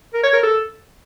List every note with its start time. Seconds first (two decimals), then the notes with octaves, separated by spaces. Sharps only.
0.14 A#4
0.23 C#5
0.33 A#4
0.43 A4